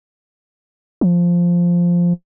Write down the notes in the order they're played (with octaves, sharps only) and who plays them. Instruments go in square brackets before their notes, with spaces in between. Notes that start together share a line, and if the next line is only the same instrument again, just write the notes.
[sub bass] F3